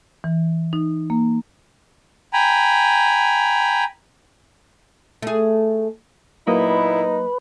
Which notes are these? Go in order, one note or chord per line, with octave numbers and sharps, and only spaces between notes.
E3
D#4
A#3
G5 G#5 A#5 B5
A3 G#4
A#2 F#3 A#3 B3 D#4 E4 B4 D#5